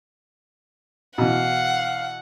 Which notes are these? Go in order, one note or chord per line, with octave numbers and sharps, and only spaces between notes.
B2 E3 F5 F#5